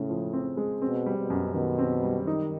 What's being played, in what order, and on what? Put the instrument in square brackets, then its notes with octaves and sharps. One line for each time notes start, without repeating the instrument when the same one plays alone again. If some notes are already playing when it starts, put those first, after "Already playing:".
Already playing: [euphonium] A2 [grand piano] C#3 G#3
[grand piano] F3
C4
G#3
[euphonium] B2 [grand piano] C4
[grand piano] G3
[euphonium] B2
[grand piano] F#2
[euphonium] B2 [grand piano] D#3
[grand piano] C4
G3
[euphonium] D#3 [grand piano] D#4